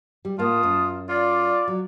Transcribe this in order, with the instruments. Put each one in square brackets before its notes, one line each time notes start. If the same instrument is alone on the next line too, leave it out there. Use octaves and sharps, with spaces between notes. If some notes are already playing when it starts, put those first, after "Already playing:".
[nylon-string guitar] G3
[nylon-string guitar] A2 A#3 [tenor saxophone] F4 [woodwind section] A5 C6 D#6
[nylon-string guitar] F#2
[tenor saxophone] F4 [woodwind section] D5
[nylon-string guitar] F#3